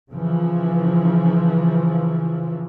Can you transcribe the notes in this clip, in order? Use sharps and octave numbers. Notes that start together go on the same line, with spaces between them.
C#3 E3 F3